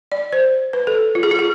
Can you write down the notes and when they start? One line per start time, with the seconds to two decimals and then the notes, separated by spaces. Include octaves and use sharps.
0.12 D5
0.33 C5
0.73 B4
0.87 A4
1.15 F4
1.23 G#4
1.31 F4
1.39 G#4